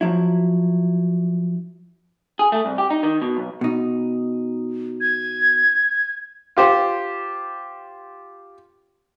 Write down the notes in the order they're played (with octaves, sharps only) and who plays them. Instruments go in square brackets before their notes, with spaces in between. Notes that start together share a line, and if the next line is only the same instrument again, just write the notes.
[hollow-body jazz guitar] F3 F#3 E4
[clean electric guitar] G#4
A3
C2
G4
D#4
D#3
B2
B1
[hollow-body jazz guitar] B2 D#4
[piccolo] G#6
[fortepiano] F4 G4 C5